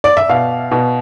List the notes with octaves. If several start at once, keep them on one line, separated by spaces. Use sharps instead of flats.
D5
E5
B2 F5
B2